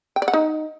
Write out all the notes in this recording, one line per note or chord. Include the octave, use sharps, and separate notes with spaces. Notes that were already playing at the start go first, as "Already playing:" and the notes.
G5
D5
F#5
D#4